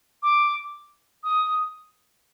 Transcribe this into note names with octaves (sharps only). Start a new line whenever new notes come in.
D6
D#6